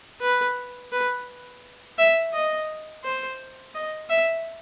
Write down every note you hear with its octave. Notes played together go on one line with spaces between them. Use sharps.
B4
B4
E5
D#5
C5
D#5
E5